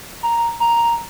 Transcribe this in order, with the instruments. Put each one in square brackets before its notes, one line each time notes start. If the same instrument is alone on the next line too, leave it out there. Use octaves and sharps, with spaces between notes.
[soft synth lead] A#5
A#5